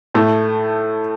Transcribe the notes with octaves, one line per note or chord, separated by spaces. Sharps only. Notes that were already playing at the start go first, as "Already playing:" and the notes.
A2 A3